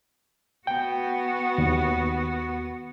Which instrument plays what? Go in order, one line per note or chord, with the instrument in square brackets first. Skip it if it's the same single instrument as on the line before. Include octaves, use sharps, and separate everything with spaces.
[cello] B3 F#4 [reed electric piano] G5
[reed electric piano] D#2